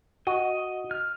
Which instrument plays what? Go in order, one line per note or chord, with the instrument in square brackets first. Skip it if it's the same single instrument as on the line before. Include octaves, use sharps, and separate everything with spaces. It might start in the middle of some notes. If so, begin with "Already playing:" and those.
[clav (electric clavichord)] F#4 [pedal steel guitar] D#5
[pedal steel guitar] F6